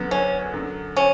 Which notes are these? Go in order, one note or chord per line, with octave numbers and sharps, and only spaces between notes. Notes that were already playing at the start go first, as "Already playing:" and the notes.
Already playing: F#2 D3 F#3 B3
C#4
F#2 D3 F#3
C#4